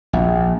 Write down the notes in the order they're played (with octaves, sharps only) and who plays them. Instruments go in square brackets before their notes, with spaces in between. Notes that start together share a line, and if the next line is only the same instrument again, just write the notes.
[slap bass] A#1